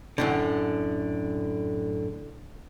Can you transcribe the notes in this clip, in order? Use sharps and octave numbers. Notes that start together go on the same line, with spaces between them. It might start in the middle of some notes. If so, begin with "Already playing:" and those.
F#2 A2 D3